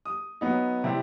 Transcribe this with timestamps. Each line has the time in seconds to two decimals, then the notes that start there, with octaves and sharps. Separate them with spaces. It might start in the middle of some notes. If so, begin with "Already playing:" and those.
0.05 D#6
0.41 F#3 B3 D#4
0.84 C3 G3 C4 E4